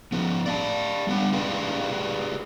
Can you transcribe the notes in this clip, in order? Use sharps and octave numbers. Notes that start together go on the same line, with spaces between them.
F3 B3
D5 F5 A5
G3 B3 F#5
G4 G#4 B4 D5 F5 G5